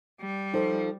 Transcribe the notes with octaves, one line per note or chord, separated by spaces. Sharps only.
G3
F3 D#4 A4